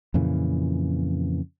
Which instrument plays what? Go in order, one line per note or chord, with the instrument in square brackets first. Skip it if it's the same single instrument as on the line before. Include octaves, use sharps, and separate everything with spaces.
[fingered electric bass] F2 A#2 C#3 E3